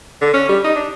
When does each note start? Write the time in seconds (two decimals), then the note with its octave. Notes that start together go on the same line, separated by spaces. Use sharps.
0.22 D3
0.34 C#4
0.49 G3
0.64 D#4
0.76 D4